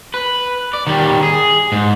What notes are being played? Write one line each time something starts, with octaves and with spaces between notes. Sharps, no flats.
B4
D5
D#3 G3
G#4
G#2